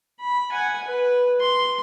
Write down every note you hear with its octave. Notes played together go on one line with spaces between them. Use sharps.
B5
F#5 G#5
B4
C6